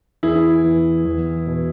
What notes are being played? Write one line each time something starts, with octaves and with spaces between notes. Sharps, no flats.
E2 E4 G#4
E2
E2
B2